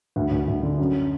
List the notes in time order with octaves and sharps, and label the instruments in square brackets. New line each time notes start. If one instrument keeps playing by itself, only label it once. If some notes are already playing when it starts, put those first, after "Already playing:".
[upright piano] D2
D2
D2
D3
F#2